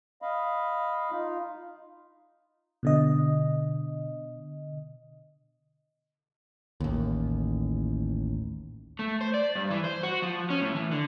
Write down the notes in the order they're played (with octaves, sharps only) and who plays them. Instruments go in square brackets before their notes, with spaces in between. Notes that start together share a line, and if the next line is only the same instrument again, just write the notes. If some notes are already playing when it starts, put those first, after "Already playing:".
[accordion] D#5 F5 B5
D#4 F4
[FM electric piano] B2 D3 D#5
[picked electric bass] A1 D#2
[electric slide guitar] A3
C5
D5
G2
E3
C5
F#4
F3
C#4
A2
E3
D3